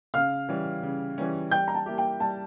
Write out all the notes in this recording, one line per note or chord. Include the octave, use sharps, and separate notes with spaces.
C#3 F5 F6
E3 G3 C#4
C#3
E3 G3 C#4
G3 G5 G6
A#5
A5
A#3 E4 G4
G5
G3 A5